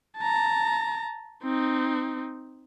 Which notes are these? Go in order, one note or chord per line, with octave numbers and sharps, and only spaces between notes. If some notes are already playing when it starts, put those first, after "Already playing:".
A5 A#5
C4 D#4